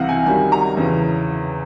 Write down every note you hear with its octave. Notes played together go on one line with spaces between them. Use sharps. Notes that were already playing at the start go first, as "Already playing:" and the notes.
Already playing: C2 C3 E3 F5 F#5
G#5
F#2 D#3 G3 G#5
A#5
E2 C#3 E3